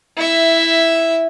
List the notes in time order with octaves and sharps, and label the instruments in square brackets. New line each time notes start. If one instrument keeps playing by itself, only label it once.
[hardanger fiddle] E4 E5